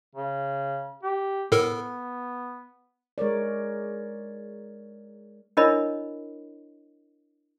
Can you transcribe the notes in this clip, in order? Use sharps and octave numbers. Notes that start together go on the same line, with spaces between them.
C#3
G4
A2 B3 A4 A#4
G#3 A#4 C#5 D5
D4 E4 A#4 C#5 D#5 B5